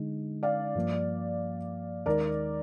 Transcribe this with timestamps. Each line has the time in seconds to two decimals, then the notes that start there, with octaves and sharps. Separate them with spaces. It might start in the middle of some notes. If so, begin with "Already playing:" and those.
Already playing: D3 G#3 D#4
0.43 D5 F5
0.75 G2 F3 A#3
2.06 D#2 D#3 G#3 D#4 A#4 D5